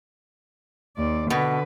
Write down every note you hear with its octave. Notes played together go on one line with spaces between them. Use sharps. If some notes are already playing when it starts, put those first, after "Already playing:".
D#2 D5
B2 D3 B4